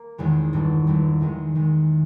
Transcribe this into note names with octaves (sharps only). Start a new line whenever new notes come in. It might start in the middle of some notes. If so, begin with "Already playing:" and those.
Already playing: A#3
E1 E2 D#3 G#3
G1 G2 G3
G1 G2 G3
E2 D#3 G#3
E2 D#3 G#3